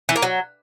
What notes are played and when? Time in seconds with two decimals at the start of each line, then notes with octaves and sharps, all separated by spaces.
0.09 E3
0.16 A#3
0.22 F#3